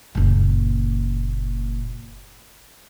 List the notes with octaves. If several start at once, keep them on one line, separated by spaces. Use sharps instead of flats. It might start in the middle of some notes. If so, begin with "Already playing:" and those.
F#1 A#2